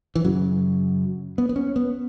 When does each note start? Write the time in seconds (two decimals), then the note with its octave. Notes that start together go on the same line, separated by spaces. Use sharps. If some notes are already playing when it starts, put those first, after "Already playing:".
0.15 E3
0.25 F#2 C#3 F#3
1.38 B3
1.49 B3
1.56 C#4
1.76 B3